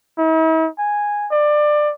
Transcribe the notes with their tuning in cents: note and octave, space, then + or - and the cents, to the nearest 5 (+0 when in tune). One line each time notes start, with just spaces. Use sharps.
E4 -45
G#5 -5
D5 +20